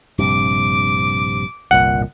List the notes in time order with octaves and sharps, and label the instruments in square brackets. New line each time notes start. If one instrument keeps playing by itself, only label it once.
[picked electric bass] A#1 G2 C3 [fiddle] D6
[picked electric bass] G1 C2 A#2 [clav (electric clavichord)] F#5